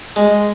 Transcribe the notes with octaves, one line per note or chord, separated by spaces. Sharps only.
G#3